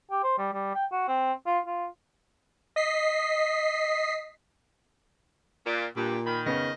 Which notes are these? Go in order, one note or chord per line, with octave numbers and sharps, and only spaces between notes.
G4
C5
G3
G3
G5
F#4
C4
F4
F4
D#5 B6 C7
A#2 D5
G2 A#2 G4
D#3 B5
C#3 B3 D#5